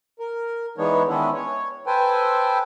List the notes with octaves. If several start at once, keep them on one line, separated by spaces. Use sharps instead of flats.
A#4
E3 G#3 B3 D4 D#4 C#5
D#3 G#3 B3 C#4 D4 E4
C#5
A4 B4 C5 G5 G#5